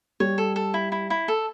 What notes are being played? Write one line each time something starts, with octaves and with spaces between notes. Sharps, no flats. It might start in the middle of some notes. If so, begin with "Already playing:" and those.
G3 C#5
A4
A4
E4
E4
E4
A4